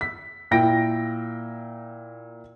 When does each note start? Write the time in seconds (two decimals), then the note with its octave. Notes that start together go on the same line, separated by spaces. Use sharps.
0.01 B6
0.51 A#2 E4 G5 A#6 D7